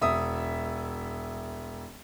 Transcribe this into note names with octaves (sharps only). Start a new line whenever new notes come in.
E1 E5 D#6